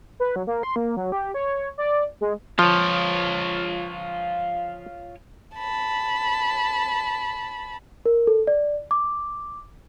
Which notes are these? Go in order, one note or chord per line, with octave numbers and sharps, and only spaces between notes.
B4
F#3
A#3
C6
A#3
F#3
G4
C#5
D5
G#3
F3 F4 C#5
A5 B5
A#4
A4
D5
D6